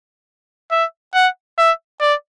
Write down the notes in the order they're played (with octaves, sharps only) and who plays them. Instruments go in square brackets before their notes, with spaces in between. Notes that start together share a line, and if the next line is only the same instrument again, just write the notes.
[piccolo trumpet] E5
F#5
E5
D5